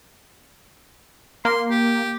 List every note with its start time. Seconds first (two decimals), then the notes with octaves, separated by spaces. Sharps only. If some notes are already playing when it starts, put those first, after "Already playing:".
1.45 A#3 C6
1.70 G4